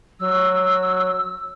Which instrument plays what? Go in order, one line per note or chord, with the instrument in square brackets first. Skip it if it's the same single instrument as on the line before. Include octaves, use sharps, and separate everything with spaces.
[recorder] F#3 [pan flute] E6